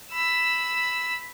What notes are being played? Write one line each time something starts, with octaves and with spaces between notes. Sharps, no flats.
B5 E6